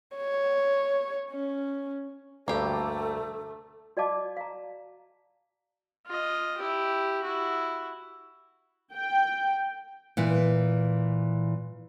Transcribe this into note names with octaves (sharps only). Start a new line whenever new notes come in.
C#5
C#4
D2 G2 A3 A#3 G4 A4
F#4 D5 D#5 F5 A5 D6
F5 A#5
F4 D#5
E4 G4
E4 F#4
G5
A#2 E3